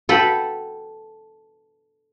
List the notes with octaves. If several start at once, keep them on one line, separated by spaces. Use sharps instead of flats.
A4 B4 F#5 G5 B5